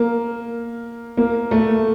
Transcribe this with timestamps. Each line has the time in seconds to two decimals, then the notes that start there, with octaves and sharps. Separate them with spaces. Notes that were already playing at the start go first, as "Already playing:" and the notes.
Already playing: A#3
1.17 A#3
1.51 A3